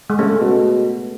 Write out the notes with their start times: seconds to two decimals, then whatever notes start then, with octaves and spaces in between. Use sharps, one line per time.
0.10 G#3
0.19 C#3 A3
0.41 B2